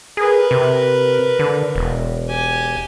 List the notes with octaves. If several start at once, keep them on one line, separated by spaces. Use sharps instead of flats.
G#4 A#4 B4
C3
D3
E1
G4 G#5